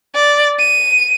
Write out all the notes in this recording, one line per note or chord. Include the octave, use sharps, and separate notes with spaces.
D5
D#7